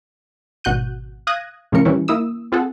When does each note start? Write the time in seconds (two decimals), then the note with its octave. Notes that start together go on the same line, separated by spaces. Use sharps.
0.64 G#1 B2 F#4 F#6 G6 D#7
1.27 F5 D#6 F#6 G#6 A#6 D#7
1.72 A2 C#3 F3 C#4 A#4 C#7
1.85 E3 G3 C#4 E4
2.08 A#3 E4 D#6 E6
2.52 C4 F4 G#4 A4 F#5